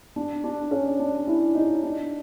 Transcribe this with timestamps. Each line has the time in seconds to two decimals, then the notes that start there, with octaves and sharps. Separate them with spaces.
0.16 D4
0.44 D4
0.71 C#4
0.99 D4
1.27 E4
1.55 D#4
1.83 D4